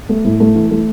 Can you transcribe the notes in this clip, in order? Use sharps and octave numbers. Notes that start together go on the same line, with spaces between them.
A3
A2
A3
E3
A3